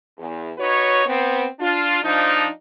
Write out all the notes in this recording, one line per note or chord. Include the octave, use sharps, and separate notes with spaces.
E2
D#4 F#4 B4 C#5
B3 C4
D4 F4
F3 D4 D#4